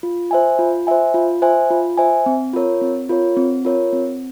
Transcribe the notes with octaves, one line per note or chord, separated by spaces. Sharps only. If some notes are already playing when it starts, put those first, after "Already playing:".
F4
C5 E5 G#5
F4
C5 E5 G#5
F4
C5 E5 G#5
F4
C5 E5 G#5
C4
F4 A#4 C#5
C4
F4 A#4 C#5
C4
F4 A#4 C#5
C4